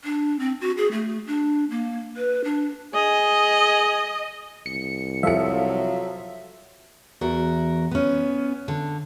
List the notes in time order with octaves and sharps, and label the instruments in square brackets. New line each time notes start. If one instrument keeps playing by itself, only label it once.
[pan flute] D4
C4
F#4
G#4
A3
D4
A#3
B4
D4
[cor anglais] G#4 [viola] D#5
[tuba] C2 [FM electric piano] C#7
[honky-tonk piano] F3 A4 C#7 [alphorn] F#3 [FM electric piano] E5
[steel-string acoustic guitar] E2 F#4 A#4
B3 C#4
D3